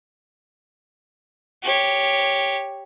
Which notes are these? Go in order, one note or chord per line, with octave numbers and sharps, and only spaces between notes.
G4 C#5